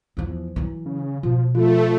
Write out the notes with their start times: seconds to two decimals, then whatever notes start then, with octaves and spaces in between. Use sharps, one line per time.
0.17 E2 F3
0.56 E3 F#3
0.86 C#3
1.23 B2 F3
1.55 F3 A3 F4